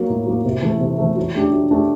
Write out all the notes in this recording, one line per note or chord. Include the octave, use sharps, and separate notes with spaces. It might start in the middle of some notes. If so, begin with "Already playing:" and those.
Already playing: F#3 A#3
A2
F#3 A#3
C3
E3 A3
C3
E3 A3
F#3
A3 D4 G4
F#3
A3 D4 G4